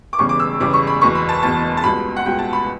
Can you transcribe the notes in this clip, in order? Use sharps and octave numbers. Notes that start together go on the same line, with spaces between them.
D6
E1 E2 C#3 G3 C#6
D6
E6
E1 E2 C#3 G3 D6
C#6
B5
F#1 E2 B2 C#6
B5
A5
F#1 E2 B2 A5
A5
C#2 B2 G3 B5
F#5
C#2 B2 G3 G5
A5
B5